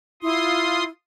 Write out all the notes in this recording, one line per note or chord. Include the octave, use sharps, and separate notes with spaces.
E4 F4 C6 D#6